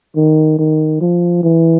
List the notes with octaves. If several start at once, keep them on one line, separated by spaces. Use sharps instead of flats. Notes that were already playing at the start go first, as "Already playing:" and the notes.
D#3
D#3
F3
E3